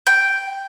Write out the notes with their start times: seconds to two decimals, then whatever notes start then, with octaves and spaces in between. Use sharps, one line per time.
0.07 G5